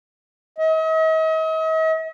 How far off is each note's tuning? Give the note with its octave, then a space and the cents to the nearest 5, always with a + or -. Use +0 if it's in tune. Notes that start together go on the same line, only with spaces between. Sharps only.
D#5 +45